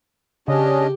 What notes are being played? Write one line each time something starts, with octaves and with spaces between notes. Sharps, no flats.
C#3 C#4 D4 G4 D#5